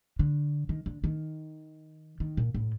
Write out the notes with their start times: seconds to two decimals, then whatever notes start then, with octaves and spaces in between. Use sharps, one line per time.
0.19 D3
0.69 D#3
0.86 D3
1.04 D#3
2.20 D#3
2.37 A#2
2.54 A2